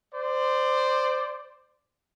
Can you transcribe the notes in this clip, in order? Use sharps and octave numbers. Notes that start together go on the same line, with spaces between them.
C5 D5